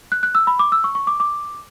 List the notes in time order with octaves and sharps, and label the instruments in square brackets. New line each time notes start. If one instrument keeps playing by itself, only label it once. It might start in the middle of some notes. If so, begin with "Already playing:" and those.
[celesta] F#6
F#6
E6
B5
D6
E6
C#6
C#6
D6
D6